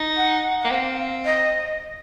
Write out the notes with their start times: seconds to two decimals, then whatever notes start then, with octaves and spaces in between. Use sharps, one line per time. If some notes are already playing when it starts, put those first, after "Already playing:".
Already playing: D#4
0.17 F#5
0.60 A#3 F#5
0.70 C4 F#5
0.75 F5
1.25 D#5